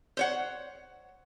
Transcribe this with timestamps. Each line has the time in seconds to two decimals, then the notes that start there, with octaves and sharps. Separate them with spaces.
0.17 C5 C#5 F#5